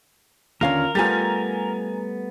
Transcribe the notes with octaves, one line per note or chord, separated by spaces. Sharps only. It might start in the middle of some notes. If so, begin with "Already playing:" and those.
D#2 D3 C#4 F4 A#4 F5
G3 A3 B3 F4 G4 G#5 A#5 A6